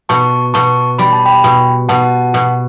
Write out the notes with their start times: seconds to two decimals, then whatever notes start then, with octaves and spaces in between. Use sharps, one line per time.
0.09 B2 A5 C#6
0.54 B2 A5 C#6
0.99 G3 B5
1.13 A5
1.26 G5 B5
1.44 B2
1.89 B2 F#5 A5
2.34 B2